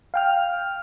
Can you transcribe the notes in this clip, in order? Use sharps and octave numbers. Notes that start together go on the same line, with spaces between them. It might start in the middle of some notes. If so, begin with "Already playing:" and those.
F5 G5 F6